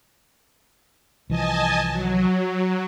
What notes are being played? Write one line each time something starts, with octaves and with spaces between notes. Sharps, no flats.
C2 E3 F3 D#5 G#5 A5
F#3